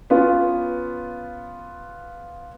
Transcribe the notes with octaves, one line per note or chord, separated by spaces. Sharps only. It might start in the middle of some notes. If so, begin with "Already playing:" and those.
B3 C#4 F4